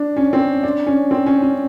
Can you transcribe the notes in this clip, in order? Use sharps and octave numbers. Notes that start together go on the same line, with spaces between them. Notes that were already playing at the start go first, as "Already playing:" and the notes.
Already playing: D4
C#4
C4
D4
C#4
C4
C#4
C#4